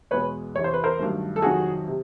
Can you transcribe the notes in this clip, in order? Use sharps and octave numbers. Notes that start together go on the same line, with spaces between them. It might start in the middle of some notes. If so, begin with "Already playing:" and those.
E2 B2 G#3 B3 B4 C#5
E2 C3 E3 C#5
C5
B4
A#4 C5
G2 D#3 F#3 A3
A4
F2 C3 D#3 F#3 F#4 G#4
C3